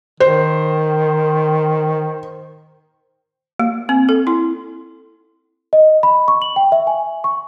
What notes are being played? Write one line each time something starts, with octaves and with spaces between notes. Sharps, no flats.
D#3 C5
A#3
C4
A4
E4
D#5
B5
C#6
F#7
G5
E5
G#5
C#6